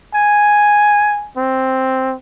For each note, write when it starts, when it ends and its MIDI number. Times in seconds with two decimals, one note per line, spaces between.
0.15 1.29 80
1.37 2.14 60